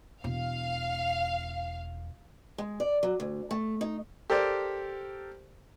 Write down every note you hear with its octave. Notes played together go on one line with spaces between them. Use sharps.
E1 F5
G#3
D5
F#3
D2
A3
D#4
G4 A4 A#4 C5 D5